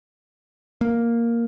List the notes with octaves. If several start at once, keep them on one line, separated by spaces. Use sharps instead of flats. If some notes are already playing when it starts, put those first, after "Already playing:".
A#3